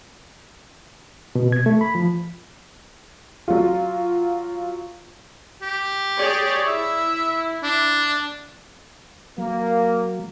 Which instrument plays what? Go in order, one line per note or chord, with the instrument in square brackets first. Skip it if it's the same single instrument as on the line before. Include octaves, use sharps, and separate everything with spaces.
[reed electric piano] B2
G#6
A3
B5
F3
[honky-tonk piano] F#3 F4
[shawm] G4
[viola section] G#4 C#5 D5
[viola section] E4 [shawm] E5
[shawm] D4
[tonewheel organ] F#3 [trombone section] A#3